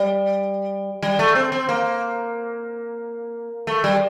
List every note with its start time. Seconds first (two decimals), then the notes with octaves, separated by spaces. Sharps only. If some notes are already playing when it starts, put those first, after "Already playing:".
Already playing: G3
1.03 G3
1.19 A3
1.35 C4
1.52 C4
1.69 A#3
3.67 A3
3.84 G3